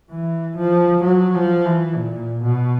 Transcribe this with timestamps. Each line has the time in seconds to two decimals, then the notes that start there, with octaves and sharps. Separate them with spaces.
0.11 E3
0.57 F3
1.04 F#3
1.35 F3
1.65 E3
1.96 A#2
2.43 B2